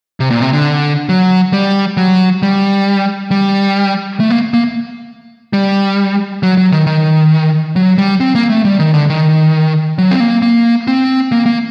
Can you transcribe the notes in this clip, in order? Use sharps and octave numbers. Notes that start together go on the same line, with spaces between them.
C3
A#2
C3
D3
F#3
G3
F#3
G3
G3
A3
A#3
A#3
G3
F#3
F#3
D#3
D#3
F#3
G3
C4
A#3
A3
G3
D#3
D3
D#3
F#3
C4
A#3
A#3
C4
A#3
A#3